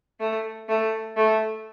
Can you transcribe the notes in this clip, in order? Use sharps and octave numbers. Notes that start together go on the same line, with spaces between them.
A3
A3
A3